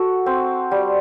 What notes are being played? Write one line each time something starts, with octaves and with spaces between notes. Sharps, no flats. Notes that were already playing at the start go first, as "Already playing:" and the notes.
Already playing: F#4 A4
C4
G3